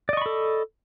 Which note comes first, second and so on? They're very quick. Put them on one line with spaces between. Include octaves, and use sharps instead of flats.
D5 D#5 C#6 B5 A4